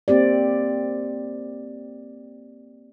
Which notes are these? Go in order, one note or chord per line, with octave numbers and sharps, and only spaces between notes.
A#3 C4 G4 D5